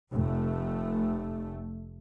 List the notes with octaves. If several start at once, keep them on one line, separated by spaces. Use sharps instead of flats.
F1 A3